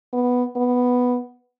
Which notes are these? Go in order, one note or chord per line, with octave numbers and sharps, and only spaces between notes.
B3
B3